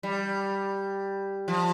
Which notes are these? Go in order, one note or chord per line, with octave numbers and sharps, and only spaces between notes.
G3
F3